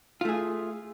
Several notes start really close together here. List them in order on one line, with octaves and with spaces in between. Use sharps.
F4 A3 G#4